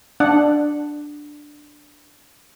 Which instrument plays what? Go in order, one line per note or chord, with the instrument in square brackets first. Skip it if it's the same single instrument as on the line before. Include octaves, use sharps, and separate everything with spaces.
[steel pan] D4 F#5